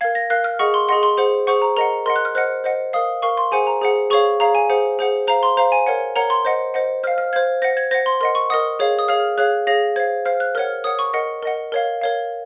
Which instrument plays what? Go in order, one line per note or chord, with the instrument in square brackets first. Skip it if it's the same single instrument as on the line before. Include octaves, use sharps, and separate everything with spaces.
[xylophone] A#4 F5 G#6
A#6
A#4 F5 F#6
F6
G#4 D#5 F#5 C#6
C6
G#4 D#5 F#5 C6
C6
G#4 C5 F#5
G#4 C5 F#5 C#6
A#5
A#4 D#5 F#5 A#5
A#4 D#5 F#5 C6
F#6
F6
C5 D#5 F#5 F#6
C5 D#5 F#5
A#4 F5 D#6
A#4 F5 C#6
C6
G#4 C5 F#5 G#5
A#5
G#4 C5 F#5
G#4 C#5 F5 C#6
G#4 C#5 F5 A#5
G#5
G#4 C5 F#5
G#4 C5 F#5
C5 F5 A#5
C6
C5 F5 A#5
G#5
A#4 C#5 F#5
A#4 C#5 F#5 A#5
C6
C5 D#5 F#5
C5 D#5 F#5
C5 F5 F6
F6
C5 F5 G#6
C5 F#5 A#6
G#6
C5 F#5 A#6
C6
A#4 D#5 F#5 C6
C#6
A#4 D#5 F#5 D#6
G#4 C#5 F5
D#6
G#4 C#5 F5 F6
G#4 C#5 F5 F#6
G#4 C#5 F5 A#6
C5 F5 G#6
C5 F5 F6
F#6
A#4 C#5 F#5 F6
A#4 C#5 F#5 D#6
C#6
A#4 D#5 F#5
A#4 D#5 F#5
A#4 C#5 F5
A#4 C#5 F5